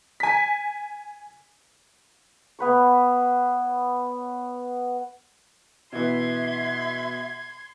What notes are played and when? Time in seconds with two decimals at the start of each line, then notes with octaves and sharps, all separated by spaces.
0.20 G#5 B6
2.59 B3 B4 C#5
5.92 B2 E3 E5 C6 G#6